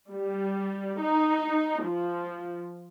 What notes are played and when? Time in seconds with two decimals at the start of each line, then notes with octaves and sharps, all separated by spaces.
0.11 G3
0.99 D#4
1.84 F3